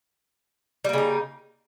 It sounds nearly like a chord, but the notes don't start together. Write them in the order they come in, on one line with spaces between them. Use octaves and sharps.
G3 A#3 C#3 D#4